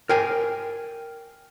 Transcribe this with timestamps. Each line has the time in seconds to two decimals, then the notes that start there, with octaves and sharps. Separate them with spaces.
0.09 A#4 G5 G#5